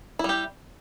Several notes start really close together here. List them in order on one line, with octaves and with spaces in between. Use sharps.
E4 G3 G4